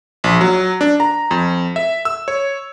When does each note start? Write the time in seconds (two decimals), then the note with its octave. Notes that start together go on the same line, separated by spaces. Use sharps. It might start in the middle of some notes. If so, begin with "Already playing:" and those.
0.24 A#1
0.41 F#3
0.81 D4
1.00 A#5
1.31 F2
1.76 E5
2.05 E6
2.28 C#5